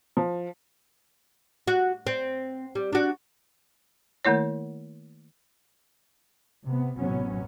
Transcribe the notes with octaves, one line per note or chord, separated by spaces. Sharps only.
F3
F#4
C4
G3
D4 F#4
D#3 A3 A#3 E4 C#5
C3 B3
A1 F#2 C3 F#3 B3 C#4